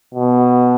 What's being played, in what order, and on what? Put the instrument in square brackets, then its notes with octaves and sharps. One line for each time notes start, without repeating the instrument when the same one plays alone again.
[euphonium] B2